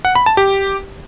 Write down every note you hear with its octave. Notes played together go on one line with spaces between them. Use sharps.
F#5
B5
A5
G4